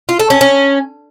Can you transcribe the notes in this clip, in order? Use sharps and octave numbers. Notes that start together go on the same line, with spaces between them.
F4
A4
C#4
C#4